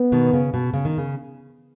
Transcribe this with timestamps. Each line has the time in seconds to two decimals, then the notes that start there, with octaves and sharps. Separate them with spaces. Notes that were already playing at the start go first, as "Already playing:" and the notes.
Already playing: B3
0.12 B2 D#3
0.33 C#3
0.54 B2
0.74 C#3
0.85 D#3
0.98 C#3